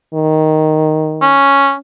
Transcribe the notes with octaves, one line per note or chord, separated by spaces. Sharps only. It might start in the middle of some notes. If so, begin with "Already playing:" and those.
D#3
C#4